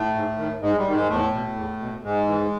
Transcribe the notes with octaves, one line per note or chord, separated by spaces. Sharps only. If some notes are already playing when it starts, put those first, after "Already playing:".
Already playing: A2 A3
G#2
D#3
G#2 G#3
G3
D#3
G#2 G#3
E2 A2 A3
B2
E2
B2
G#2 G#3
E3